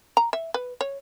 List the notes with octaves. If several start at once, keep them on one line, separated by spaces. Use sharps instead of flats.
A#5
E5
B4
C#5